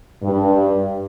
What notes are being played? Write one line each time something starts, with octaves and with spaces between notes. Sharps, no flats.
G2